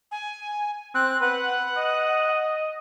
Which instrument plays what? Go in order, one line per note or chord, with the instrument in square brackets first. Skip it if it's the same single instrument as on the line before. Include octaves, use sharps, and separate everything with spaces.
[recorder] G#5
[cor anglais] C4 [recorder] F#6
[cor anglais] B4 [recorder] F#5
[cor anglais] D#5